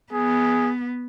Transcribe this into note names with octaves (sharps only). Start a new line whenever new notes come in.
B3 G#4